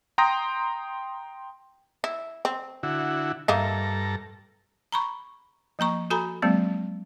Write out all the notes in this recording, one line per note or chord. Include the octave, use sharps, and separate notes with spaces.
G5 A#5 C6 D#6 G6 A#6
E4
C4
D3 E4 F#4
G2 A#3 D#4 E4 A4 A#5
A#5 B5 C#6
F3 A#3 A#5 C#6
F#4 A4 G#5 A#5 B5
F#3 G#3 A#3 C4